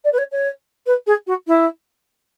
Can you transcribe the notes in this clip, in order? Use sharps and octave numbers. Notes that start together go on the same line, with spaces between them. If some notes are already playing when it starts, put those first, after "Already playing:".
D5
B4
C#5
C#5
B4
G#4
F#4
E4